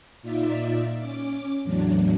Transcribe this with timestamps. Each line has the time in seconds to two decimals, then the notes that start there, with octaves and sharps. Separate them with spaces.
0.23 A#2 D#4 F4 D5 E5
0.97 C#4 D6
1.64 E2 A2 F#3 D4